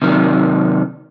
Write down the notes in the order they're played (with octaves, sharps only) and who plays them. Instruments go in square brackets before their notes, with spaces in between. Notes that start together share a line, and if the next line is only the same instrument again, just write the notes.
[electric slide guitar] C3 D#3 F#3